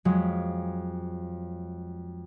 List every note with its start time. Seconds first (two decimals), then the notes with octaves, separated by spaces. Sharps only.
0.05 F2 F3 F#3 G#3 B6